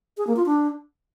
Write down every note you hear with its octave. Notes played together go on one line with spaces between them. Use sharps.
G#4
A#3
F4
D4